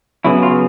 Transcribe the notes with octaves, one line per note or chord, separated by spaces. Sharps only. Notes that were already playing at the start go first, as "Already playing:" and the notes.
C#3 F#3 B3 E4
F4